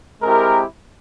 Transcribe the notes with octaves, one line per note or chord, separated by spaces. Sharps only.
G#3 C4 E4 G4 A#4